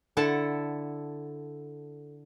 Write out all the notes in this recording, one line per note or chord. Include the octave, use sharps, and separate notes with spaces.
D3 E4 A4 F#5 A5